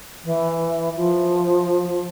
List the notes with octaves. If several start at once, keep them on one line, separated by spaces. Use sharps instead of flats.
E3
F3